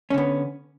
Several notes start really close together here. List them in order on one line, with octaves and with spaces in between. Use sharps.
C#4 D3 B3